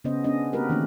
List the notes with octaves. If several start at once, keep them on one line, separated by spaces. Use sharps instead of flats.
C#3 B3 C#4 C5 D#5
B3 C#4 D4 D#5
A#3 C4 F#4 G4 A#4 B4
D#3 E3 A3 A#3 C#4 D#4